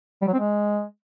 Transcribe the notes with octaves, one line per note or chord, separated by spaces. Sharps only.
G3
F#3
C4
G#3